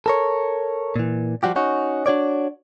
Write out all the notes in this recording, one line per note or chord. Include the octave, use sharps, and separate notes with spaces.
A4 A#4 C#5
A#2 E3
F3 G3 F#4 G4
C#4 D#4 F#4
D4 F#4 C#5 D5